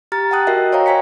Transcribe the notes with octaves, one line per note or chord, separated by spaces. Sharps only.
G4 A#5 F6 A6
F#5 G5 A5 D#6 F#6
F#4 A#4 D#5 E5
C5 C#5 F5 G5 A#5
C5 E5 G#5 B6 C#7